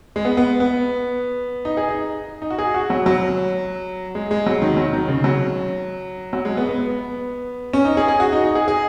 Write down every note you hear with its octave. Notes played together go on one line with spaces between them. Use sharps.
G#3
B3
B3
B3
D#4
G#4
D#4
D#4
F#4
G#4
F#4
F#3
F#3
G#3
G#3
F#3
D#3
F#3
D#3
C#3
F#3
F#3
G#3
B3
B3
C#4
D#4
G#4
G#4
F#4
D#4
D#4
G#4
G#4